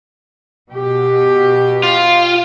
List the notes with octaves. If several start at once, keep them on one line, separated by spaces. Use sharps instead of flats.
B2 G4
F4